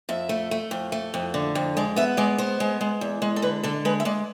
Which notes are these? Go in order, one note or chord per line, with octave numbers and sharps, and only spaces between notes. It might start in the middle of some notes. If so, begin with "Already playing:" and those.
F2 E5
A3
A3
F2
A3
F2
D3
F2
G#3 D5
B3 E5
G#3 D5
B3 C5
G#3
G#3
E2
G#3
A4
D3 B4
D3 A4
G#3 B4
E5
G#3 D5